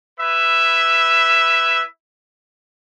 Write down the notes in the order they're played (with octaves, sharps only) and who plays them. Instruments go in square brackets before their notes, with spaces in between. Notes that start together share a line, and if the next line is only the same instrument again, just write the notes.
[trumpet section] E4 B4 E5